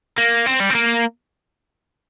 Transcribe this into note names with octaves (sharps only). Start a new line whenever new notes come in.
A#3
C4
G3
C4
A#3